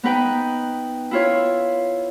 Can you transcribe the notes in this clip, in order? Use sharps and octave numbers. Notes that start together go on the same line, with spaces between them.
B3 D#4 B4 G5
E4 F4 C#5